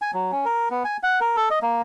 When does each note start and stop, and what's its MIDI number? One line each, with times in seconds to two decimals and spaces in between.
0.02 0.11 80
0.14 0.31 54
0.32 0.45 61
0.45 0.69 70
0.71 0.83 59
0.85 0.97 80
1.03 1.20 78
1.21 1.36 70
1.36 1.49 69
1.50 1.59 75
1.62 1.82 58